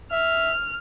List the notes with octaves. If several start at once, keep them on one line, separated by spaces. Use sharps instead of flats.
E5 F6